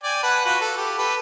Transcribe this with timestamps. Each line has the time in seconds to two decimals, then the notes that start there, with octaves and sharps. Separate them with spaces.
0.03 D5 G5 G#5
0.23 B4 F#5 A5
0.45 F4 F#4 B4
0.61 A4
0.77 G4
0.98 G4 A4 B4